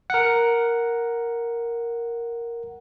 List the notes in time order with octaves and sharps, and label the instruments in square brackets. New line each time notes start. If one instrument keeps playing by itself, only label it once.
[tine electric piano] A#4 F#5